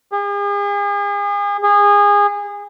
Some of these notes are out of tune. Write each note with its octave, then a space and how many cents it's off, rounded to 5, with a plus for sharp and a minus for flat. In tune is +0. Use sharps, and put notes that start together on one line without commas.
G#4 -40
G#4 -25